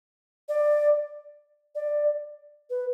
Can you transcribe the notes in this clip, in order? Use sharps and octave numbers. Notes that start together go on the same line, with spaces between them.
D5
D5
B4